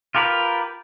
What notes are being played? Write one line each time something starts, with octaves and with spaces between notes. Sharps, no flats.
F4 G4 A#4 B4